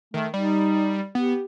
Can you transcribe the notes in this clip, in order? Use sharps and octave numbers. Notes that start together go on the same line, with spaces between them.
D#3 A3
G3 D#4
B3 G4